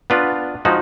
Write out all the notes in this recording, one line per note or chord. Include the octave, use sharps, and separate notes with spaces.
B3 D4 F4 B4
F3 G#3 D#4 F#4